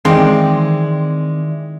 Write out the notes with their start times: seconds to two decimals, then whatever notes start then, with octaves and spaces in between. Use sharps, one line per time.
0.05 D#3 E3 G#3 C4 D5 F5 G5